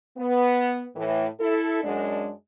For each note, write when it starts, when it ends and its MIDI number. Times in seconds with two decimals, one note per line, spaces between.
0.17 0.86 59
0.96 1.25 45
0.96 1.25 52
1.40 1.79 64
1.40 1.79 69
1.82 2.30 42
1.82 2.30 56
1.82 2.30 62